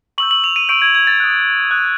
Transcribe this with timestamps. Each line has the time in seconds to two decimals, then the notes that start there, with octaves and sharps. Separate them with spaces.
0.18 C#6 E6 G6 F#7
0.31 F#7
0.44 F7
0.56 D#7
0.69 C#6 E6 G6 D7
0.82 G#6
0.95 G#6
1.07 A6
1.20 D#6 F#6
1.71 D#6 F#6